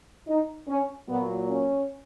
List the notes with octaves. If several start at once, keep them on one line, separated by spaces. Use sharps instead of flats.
D#4
C#4
A#2 F#3 B3
C#4